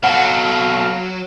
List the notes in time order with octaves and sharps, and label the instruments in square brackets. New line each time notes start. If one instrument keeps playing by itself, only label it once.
[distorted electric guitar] B2 A4 [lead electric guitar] F#3 [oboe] F5 [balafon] F#5